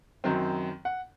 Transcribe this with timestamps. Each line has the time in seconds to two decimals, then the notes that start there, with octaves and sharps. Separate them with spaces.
0.24 F#2 D#3 F#3 C4
0.85 F#5